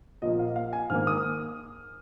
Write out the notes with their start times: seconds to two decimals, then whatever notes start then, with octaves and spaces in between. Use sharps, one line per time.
0.22 A#2 F3 A#3 D#5
0.39 F5
0.56 F5
0.73 G#5
0.90 G#2 D#3 A#3 F6
1.07 D#6